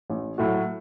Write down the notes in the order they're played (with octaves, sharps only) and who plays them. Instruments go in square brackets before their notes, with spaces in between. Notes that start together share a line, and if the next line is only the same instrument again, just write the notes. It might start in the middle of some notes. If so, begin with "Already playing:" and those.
[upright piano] A1
A2 F#3 A3 F#4